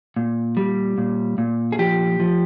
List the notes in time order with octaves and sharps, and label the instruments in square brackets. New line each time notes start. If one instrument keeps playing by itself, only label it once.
[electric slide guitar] A#2
G3
A#2
A#2
G#4
F3 G4
F3